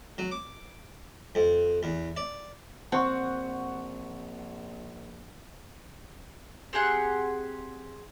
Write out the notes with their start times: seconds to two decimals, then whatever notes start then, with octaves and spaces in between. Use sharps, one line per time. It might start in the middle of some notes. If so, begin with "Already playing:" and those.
0.18 F#3
0.31 D6
1.35 F2
1.83 E2
2.17 D5
2.92 A#1 C4 F#5 C#6
6.73 C4 G4 G#4 F#5